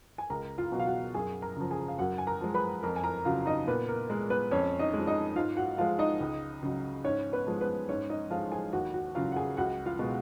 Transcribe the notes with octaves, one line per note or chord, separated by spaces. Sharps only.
G#5
C#2 A#4 A#5
F4 F5
B2 F#3
F5
F#4 F#5
F#2 G#4 G#5
A#4 A#5
C#3 F3
G#4 G#5
F5
F#2 F#4 F#5
G#5
A#4 A#5
F3 G#3
B4 B5
F2 A#4 A#5
G#5
A#4 A#5
C#3 F#3 F4 F5
D#4 D#5
A#2 B3 B4
A#4
G#3 A#4
B3 B4
F2 C#4 C#5
D#4 D#5
F3 G#3
D#4 D#5
G#2 F4 F5
F#4 F#5
F3 G#3 F4 F5
D#4 D#5
C#2
C#3 F#3
G#2 C#4 C#5
B3 B4
F3 G#3
B3 B4
G#2 C#4 C#5
D#4 D#5
F3 G#3 F4 F5
G#4 G#5
D#2 F#4 F#5
F#4 F#5
C#3 F#3 F4 F5
F#5
G#4 G#5
C#2 F#4 F#5
F4 F5
B2 G#3